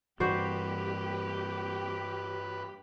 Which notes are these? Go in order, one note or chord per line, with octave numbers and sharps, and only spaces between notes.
G2 E3 F#4 G4 B4 C5 D5